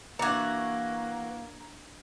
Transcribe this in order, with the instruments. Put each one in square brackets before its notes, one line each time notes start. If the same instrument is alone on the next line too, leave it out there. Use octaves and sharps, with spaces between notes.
[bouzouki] E3 F#4 [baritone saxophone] A#3 [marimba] D4 D6 A6 [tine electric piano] A#5 G#6